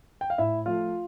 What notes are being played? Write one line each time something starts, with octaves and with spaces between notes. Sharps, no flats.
G5
F5
A2 E4 E5
F3 A3 F4 F5